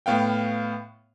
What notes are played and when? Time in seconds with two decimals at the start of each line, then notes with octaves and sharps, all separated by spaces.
0.06 A2 B3 F5 G5